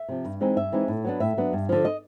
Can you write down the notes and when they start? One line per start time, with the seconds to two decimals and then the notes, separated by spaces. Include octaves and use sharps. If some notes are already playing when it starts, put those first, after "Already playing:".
Already playing: E5
0.09 C3 F3
0.25 G2
0.40 E3 G#3 C4 D#4
0.56 G2 E5
0.72 E3 G#3 C4 D#4
0.88 A2
1.05 F#3 B3 D4
1.20 A2 E5
1.37 F#3 B3 D4
1.53 G2
1.69 D3 F3
1.85 D#5